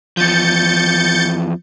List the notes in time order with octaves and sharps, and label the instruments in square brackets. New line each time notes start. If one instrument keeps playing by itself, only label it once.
[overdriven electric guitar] E2 F3 [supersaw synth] G6 A6 C#7